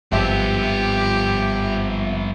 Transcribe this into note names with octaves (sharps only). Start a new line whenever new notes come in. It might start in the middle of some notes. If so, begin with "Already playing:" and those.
G#1 G2 F3 B3 G4 E5